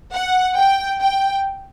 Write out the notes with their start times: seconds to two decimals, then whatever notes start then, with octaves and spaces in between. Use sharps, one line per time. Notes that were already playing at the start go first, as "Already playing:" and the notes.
0.12 F#5
0.56 G5
0.99 G5